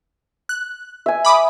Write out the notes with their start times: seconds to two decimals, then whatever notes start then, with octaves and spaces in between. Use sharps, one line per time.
0.49 F#6
1.06 E5 G#5
1.25 B5 D6 D#6